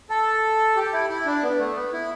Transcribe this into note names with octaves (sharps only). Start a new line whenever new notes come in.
A4
G4
E4
E4
D4
B3
A3
B3
E4